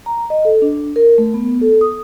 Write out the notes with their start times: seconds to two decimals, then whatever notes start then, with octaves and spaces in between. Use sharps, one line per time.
0.06 A#5
0.30 D#5
0.45 A4
0.62 D4
0.96 A#4
1.18 A3
1.34 B3
1.61 A4
1.81 D#6